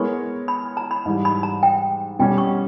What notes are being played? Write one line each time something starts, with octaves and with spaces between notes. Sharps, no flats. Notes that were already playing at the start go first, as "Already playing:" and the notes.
Already playing: G#3 B3 E4 A#4 C#5 C#6
B5
A#5
B5
G#2 E3 G3
B5
A#5
G5
B2 G3 C#4 G4 G5
C#6